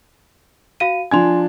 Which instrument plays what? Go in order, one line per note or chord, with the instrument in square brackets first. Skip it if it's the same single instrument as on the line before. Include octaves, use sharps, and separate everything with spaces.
[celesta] F#4 F5 D#7
[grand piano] F3 D4 G#6 [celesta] G#5 C6